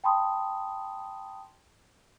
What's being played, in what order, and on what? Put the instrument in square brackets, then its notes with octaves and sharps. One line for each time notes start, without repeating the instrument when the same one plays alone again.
[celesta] G5 A5 B5 C6 D#6